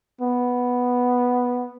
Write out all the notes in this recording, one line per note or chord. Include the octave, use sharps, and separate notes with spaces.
B3